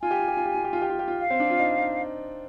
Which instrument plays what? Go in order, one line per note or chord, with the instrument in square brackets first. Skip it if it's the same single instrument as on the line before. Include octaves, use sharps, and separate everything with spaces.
[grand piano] F4 [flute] G#5
[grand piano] G4
F4
G4
F4
G4
F4
G4
F4
G4
F4
G4
F4
[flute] F5
[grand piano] C4
D4
F4
D#4
D#4